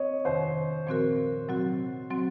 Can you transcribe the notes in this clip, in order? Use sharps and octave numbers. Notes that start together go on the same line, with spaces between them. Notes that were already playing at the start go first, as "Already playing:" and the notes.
Already playing: C4 C#5 D#5
F2 C3 D#3 C5
A#2 F3 C4 F#4 A#4
C3 F#3 C4 F#4
F#3 C4 F#4